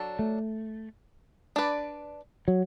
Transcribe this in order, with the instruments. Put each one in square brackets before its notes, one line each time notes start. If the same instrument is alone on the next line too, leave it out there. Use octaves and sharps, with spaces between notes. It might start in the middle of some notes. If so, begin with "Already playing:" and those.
Already playing: [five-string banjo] F#3 D4 F#4 A4
[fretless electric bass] A3
[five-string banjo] D4 B4 D5
[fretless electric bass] F#3